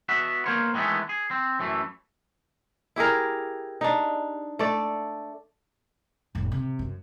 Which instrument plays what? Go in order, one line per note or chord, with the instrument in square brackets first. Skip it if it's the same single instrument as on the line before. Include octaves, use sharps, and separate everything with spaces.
[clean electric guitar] B3 F#4 E5
A#3 B3 A#4 C5 C#5
D#3 E3 G#3 A3 B3
G#4
C4
F#2 E3 A3
[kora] E4 G4 G#4 A#4
D4 D#4
A3 D5
[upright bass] F1 A2
C3
F#2